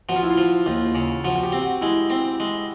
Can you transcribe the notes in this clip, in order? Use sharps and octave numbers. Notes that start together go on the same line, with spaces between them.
F3 F#4
F4
E4
F4
F3
D#2 F4
C#3
F3 F#4
F#4
G4
C4
F#4
G#3 E4
C4
G#3